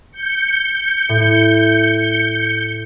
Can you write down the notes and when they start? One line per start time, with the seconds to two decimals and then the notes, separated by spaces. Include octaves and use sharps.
0.12 G6 C#7
1.09 A2